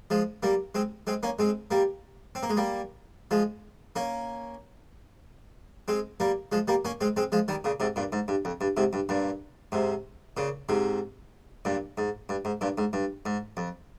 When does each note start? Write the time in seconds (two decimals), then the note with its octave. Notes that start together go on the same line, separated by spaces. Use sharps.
0.10 F3 G#3
0.43 G3 A#3
0.75 G#3 C4
1.07 G#3 C4
1.23 A#3 C#4
1.39 G#3 C4
1.71 G3 A#3
2.35 C4
2.43 A#3
2.50 G#3
2.57 G3 A#3
3.31 F3 G#3
3.96 A#3 C#4
5.88 G#3 C4
6.20 G3 A#3
6.52 F3 G#3
6.68 G3 A#3
6.85 A#3 C#4
7.01 G#3 C4
7.17 G#3 C4
7.32 F3 G#3
7.48 D#3 G3
7.64 A#2 C#3
7.80 G#2 C3
7.96 G2 A#2
8.12 G#2
8.28 G2
8.45 F2
8.61 G2
8.77 G#2 C3
8.93 G2
9.09 G2 A#2
9.72 G#2 C3
10.37 A#2 C#3
10.69 G#2 C3
11.65 G2 A#2
11.98 G#2
12.29 G2
12.45 G#2
12.61 G2 A#2
12.78 G#2
12.93 G2
13.26 G#2
13.57 F2